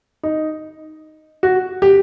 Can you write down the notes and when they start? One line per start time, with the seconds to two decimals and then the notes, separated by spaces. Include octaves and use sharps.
0.23 D#4
1.43 F#4
1.82 G4